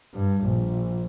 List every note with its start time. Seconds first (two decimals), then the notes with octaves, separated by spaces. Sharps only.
0.14 G2
0.44 A#1